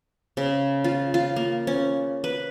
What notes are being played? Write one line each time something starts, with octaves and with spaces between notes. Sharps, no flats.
C#3
F4
F4
A#3
C#4
B4